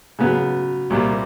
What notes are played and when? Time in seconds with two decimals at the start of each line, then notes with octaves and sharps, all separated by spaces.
0.19 C#3 F#3 B3
0.90 C2 A#2 G3 A#3